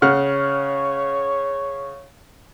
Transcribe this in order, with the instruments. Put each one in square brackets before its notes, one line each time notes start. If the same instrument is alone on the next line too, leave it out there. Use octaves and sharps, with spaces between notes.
[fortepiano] C#3 F#5 F6 [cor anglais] C#5